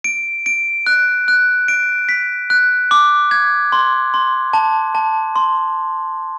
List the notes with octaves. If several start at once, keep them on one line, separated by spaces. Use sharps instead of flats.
D7
D7
F#6
F#6
D7
B6
F#6
D6
G#6
C6
C6
A5
A5
C6